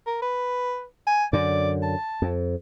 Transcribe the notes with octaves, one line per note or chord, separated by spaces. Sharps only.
A#4
B4
G#5
F#2 D3 D5
A5
F2